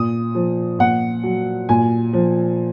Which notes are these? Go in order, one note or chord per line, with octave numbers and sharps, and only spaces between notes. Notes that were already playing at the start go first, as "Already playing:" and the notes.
Already playing: A#2 D#6
F3
A#2 F#5
F#3
A#2 G#5
F3